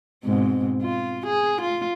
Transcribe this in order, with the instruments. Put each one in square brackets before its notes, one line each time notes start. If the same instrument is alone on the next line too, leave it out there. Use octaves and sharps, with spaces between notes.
[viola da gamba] G#2 B2 C4
F4
G#4
F4